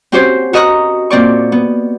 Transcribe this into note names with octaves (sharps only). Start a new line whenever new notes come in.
C4 C#4 F#4 G4 C5 C#5
F#4 A#4 D#5 A#5 C#6 F#6
A#2 C4 D5 C#6
B3